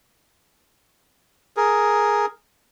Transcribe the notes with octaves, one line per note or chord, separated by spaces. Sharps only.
G#4 A#4